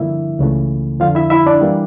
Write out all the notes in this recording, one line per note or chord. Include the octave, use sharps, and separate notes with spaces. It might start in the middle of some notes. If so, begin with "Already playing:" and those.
Already playing: G2 D3 F3 A#3 E4 E5
C#2 C#3 E3 A3
F2 D3 F3 F4 F5
E4 E5
E4 E5
D4 D5
E3 G3 A#3